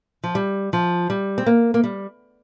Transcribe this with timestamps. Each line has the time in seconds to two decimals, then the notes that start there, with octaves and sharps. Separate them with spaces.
0.24 F3
0.35 G3
0.73 F3
1.10 G3
1.38 C4
1.46 A#3
1.74 A#3
1.84 G3